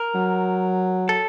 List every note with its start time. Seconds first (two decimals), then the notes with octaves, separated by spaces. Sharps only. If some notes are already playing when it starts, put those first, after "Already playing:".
Already playing: A#4
0.15 F#3
1.09 A4